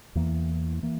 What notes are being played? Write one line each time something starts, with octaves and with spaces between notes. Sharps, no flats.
E2 E3 A#3
E3 A#3